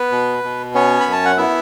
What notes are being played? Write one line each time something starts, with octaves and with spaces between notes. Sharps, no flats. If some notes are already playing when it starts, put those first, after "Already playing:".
Already playing: B3 B4
B2
B2
B3 C#4 C#5
B5
F#2
A5
F#5
B3 E4 E5